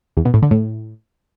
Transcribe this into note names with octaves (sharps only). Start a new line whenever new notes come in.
E2
B2
A2
D3
A2